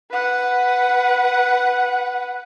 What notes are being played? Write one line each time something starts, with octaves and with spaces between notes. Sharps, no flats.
B4 F#5